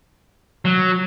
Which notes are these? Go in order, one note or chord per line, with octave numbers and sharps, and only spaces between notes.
F#3